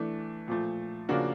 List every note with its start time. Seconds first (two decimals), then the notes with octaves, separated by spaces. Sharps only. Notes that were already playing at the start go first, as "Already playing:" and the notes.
Already playing: E3 A3 D4
0.48 A#2 F3 A3
1.09 C#3 F3 A#3 D4 F#4